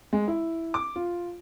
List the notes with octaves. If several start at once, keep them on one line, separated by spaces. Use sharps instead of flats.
G#3
E4
D6
F4